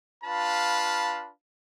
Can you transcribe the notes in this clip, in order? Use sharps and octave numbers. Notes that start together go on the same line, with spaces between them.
D4 F4 B4 F5 A5 B5